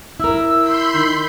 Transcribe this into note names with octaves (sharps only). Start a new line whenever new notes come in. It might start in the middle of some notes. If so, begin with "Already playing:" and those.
E4 A#4 E6
B5 C6 G6
D#3